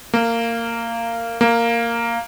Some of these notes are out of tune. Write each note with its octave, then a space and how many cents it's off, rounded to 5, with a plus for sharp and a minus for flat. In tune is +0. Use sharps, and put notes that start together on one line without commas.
A#3 -20
A#3 -10